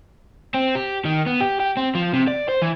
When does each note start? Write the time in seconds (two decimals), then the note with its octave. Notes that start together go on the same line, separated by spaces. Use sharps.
0.54 C4
0.75 G4
1.05 D#3
1.26 B3
1.41 G4
1.60 G4
1.77 C4
1.95 F3
2.13 C3
2.27 D5
2.49 C5
2.62 E3